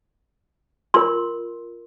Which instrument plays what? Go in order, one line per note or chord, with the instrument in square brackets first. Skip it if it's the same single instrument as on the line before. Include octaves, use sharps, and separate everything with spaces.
[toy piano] F4 A#4 C6